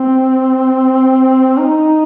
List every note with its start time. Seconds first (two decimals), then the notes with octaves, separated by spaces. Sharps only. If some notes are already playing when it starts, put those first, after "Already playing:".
Already playing: C4
1.58 D#4